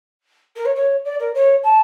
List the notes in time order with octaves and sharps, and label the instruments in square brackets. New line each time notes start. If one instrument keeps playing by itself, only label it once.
[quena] A#4
C#5
C#5
D5
A#4
C#5
A5